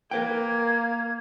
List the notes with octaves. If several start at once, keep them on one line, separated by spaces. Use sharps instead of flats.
A#3 A#4 B4 G5 G#6